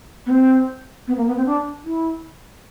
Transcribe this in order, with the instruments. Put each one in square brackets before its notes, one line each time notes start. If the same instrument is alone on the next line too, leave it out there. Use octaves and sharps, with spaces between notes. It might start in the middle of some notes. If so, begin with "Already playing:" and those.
[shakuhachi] B3
C4
B3
A#3
B3
C4
D4
E4